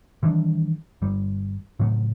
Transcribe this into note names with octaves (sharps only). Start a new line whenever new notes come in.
D#3 E3 G3 D4
G1 G3
A2 C#3 F#3 A3